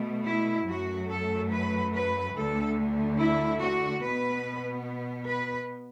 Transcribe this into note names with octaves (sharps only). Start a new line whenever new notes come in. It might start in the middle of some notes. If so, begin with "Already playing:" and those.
Already playing: B2 A3
E4
F#2 F#3 A3 F#4
A4
B4
B4
D2 D3 A3 A4
E4
F#4
B2 B3 B4
B4